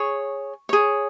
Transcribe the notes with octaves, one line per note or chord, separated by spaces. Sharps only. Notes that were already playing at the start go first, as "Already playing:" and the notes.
Already playing: G#4 C#5 C#6
G#4 C#5